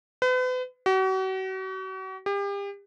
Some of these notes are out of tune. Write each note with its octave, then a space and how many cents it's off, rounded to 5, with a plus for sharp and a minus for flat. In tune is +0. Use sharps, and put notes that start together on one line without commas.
B4 +40
F#4 +40
G4 +35